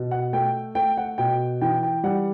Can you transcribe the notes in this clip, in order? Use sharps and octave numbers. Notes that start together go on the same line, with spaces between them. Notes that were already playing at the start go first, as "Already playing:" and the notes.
Already playing: B2
F#5
A3 G5
A3 G5
F#5
B2 G5
E3 G5
G5
G3 F#5